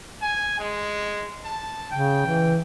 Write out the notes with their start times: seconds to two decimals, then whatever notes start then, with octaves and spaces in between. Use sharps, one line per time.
0.22 G#5
0.59 G#3
1.45 A5
1.91 C#3 G5
2.27 E3